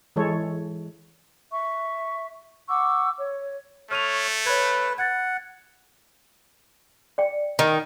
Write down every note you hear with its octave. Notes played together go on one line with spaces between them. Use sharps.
E3 G#3 A4 C#5
E5 C#6
F#5 C#6 D6 E6
C#5
A3 C#5 F6 D#7 F7
B4 C#5 G#6
F#5 G#6 A6
D5 G5
D#3 A#5